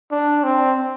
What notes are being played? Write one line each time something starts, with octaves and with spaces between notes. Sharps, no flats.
D4
C4